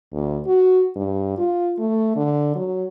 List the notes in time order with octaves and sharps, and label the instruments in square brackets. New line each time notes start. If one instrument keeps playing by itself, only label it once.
[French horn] D2
F#4
G2
F4
A3
D3
F#3